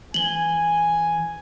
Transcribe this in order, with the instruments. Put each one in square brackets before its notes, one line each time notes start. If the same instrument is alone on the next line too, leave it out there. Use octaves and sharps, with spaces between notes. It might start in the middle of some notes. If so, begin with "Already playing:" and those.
[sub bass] E3 [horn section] G#5 [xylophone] F#7 G7